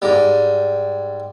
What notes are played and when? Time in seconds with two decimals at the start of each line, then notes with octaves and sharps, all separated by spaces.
0.02 G#2 G3